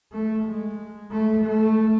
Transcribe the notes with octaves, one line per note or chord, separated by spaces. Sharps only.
A3
G#3
A3
A3